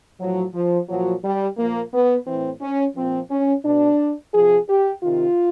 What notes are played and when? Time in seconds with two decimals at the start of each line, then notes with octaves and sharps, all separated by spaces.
0.20 A2 F3 F#3
0.54 F3
0.89 A#2 F3 F#3
1.24 G3
1.58 A#2 F3 A#3
1.93 B3
2.27 A2 E3 C4
2.62 C#4
2.96 A#2 F3 C4
3.30 C#4
3.65 B2 D4
4.33 C3 F3 G#4
4.68 G4
5.03 C3 D#3 F4